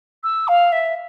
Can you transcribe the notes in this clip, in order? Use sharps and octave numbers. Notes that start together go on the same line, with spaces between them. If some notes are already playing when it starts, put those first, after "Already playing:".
E6
F5
E5